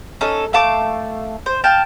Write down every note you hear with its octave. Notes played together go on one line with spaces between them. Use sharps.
C#4 D#4 A4
A3 F5 A5 D6
C5
F5 G5 A5